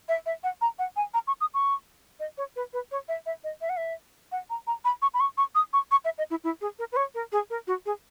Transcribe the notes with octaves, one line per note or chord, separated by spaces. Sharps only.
E5
E5
F#5
A#5
F#5
G#5
A#5
C#6
D#6
C#6
D#5
C#5
B4
B4
C#5
E5
E5
D#5
E5
F#5
E5
F#5
A#5
A#5
B5
C#6
B5
C#6
C#6
D#6
C#6
C#6
E5
D#5
E4
E4
G#4
A#4
B4
C#5
A#4
G#4
A#4
F#4
G#4